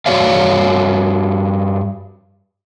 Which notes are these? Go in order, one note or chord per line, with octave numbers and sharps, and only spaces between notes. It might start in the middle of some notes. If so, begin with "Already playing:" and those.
G2 A#3 F#4 C#5 D5 F5